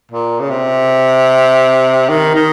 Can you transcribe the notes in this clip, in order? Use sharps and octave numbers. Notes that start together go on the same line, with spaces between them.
A#2
C#3
C3
D#3
D#3